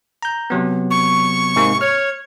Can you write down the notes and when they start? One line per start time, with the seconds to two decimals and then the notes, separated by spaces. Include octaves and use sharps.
0.22 A#5 G6
0.50 C3 F#3 B3
0.91 C#6
1.56 G#2 C3 A#3
1.81 C#5 F6